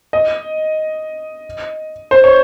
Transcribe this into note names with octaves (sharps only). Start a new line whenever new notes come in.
D#5
C5
C#5